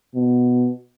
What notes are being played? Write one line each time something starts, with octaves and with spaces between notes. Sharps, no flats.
B2